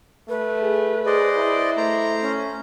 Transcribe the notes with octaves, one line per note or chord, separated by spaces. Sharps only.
A3 B4
G#4
G#4 C5 D5 D#5
E4
A3 C5 A#5
C#4